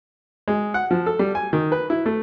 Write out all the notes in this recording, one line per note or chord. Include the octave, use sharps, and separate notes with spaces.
G#3
F#5
F3
A4
G3
G#5
D#3
B4
E4
A3